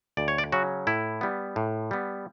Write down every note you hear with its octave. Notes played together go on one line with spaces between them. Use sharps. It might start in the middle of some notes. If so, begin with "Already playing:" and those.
D2 D5
C#5
D5
C#3 F#3 C#4 F#4
A2 E4
G3 B3
A2
G3 B3